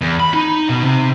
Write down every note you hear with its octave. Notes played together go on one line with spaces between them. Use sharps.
E2
B5
D#4
B2
C3